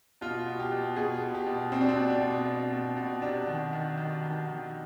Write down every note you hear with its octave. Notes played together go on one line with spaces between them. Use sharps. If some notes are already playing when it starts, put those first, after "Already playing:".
B2 F4
B2
G4
B2
B2 G#4
B2
G4
B2
B2 C4
D4
C4
B2
D4
B2
B2
B2
B2
C3 D4
D#3
D#3
D#3
D#3
D#3